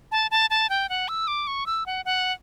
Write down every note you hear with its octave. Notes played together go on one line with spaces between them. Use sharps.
A5
A5
A5
G5
F#5
E6
D6
C#6
E6
F#5
F#5